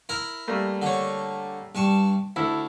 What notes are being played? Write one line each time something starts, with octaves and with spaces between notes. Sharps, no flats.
E4 A#4
G3 A3 A#3
D3 C#5
G2 A5 C#6
D2 E4 A4